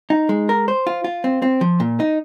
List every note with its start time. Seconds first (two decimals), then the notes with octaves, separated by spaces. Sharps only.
0.10 D#4
0.29 G#3
0.49 A#4
0.68 C5
0.87 F4
1.04 F4
1.24 C4
1.42 C4
1.61 F3
1.80 A#2
2.00 D#4